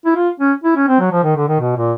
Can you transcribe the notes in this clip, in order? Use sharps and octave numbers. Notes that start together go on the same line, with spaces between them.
E4
F4
C#4
E4
C#4
C4
F#3
F3
D#3
D3
D#3
B2
A#2